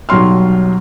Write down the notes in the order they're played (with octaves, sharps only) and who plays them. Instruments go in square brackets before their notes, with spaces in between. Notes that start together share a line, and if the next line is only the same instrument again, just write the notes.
[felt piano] B1 F#3 G3 C6 F6